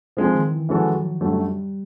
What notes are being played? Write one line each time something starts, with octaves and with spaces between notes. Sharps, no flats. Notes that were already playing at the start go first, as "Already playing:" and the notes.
F3 G#3 C4 F4
D#3
E3
E3 F3 G#3 C#4 F#4 A4
F#3
F#2 D3 F#3 G3 A3